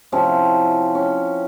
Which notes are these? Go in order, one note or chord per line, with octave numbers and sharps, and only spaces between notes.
C3 F3 C#4 E4
C#4